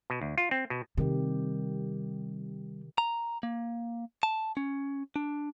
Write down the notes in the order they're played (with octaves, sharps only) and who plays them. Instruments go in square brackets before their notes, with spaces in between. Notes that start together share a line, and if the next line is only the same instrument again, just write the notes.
[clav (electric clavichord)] B2
D2
F4
C4
B2
[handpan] C3 D#3 G4 [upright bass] G3
[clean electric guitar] A#5
A#3
A5
C#4
D4